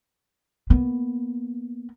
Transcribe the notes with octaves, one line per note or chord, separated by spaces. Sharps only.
A#3 B3